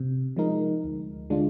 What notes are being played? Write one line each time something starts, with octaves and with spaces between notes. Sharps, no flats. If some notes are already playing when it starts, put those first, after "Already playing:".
Already playing: C3
F3 G#3 D#4 A#4
D2
D3 G#3 D4 F4